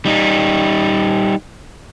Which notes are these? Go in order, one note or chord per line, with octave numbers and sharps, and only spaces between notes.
G3 D#4